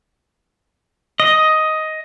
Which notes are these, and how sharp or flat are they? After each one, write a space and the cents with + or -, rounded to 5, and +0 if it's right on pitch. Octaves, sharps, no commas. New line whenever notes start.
D#5 +10